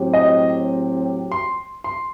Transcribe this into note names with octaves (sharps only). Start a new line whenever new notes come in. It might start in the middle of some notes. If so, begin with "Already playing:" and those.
Already playing: A2 F#3 C4 G4
D#5
C6
C6